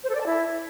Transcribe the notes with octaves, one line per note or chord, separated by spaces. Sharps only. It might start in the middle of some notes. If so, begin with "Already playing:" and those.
C5
A4
D5
A5
E4